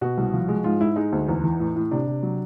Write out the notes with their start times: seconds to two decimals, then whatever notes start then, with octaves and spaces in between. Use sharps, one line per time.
0.01 B2 F#4
0.18 C2
0.33 F3
0.48 G#3
0.64 G#2 F4
0.80 G#2 E4
0.96 G#3 D#4
1.12 D2
1.29 E2
1.43 E3
1.60 A2
1.76 A2
1.91 C3 D4
2.07 C3
2.23 F#3